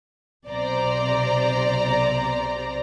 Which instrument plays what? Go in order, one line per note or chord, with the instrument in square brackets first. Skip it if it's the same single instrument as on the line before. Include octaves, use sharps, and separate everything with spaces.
[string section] B1 C3 C5 D5 A#5